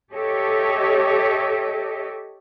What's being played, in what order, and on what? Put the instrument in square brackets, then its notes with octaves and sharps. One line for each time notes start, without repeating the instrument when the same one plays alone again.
[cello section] G4 A4 C#5 D#5 E5